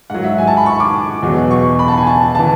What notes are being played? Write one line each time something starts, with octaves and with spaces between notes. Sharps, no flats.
G#2 F#3 F#5
E5
G#5
A5
B5
C#6
D6
E2 B2 F#3
C#6
B5
A5
G#5
A5
A5
E3